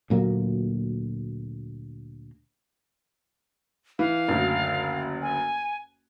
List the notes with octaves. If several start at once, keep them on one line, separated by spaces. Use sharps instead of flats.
D2 A#2 F#3 A#3
E3 F5
F#1 D2
G#5